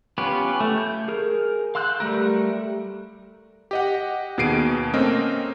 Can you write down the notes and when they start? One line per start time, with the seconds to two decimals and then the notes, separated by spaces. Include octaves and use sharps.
0.18 B3 C#4 F4 G4 B4
0.60 A3
0.78 G6
1.08 G#4 A#4
1.75 F5 C6 E6 F#6 G6
2.00 G3 A3 A#4
3.71 G4 D#5 F#5
4.38 D#2 B2 G#4 C7 D7 D#7
4.93 A3 A#3 C4 C#4 A#4 D#5